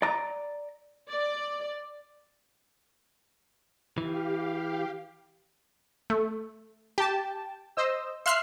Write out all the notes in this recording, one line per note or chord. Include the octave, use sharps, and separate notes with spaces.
D5 A#5
D5
E3 G4 F5
A3
G4 G5 A5
C5 D#5 E6
E5 F5 C6 F6 F#6 C7